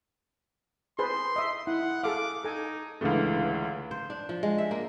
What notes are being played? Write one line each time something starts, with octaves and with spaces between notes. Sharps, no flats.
G#4 B4 C5 C6
D#5 E5
E4 F#5
G#4 A4 F5 D6
D#4 A4 G#5
C#2 D3 E3 G#3 A3
C5
D4
F3
G#3
E5
A#3